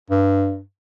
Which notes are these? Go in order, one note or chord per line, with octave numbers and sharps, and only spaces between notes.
G2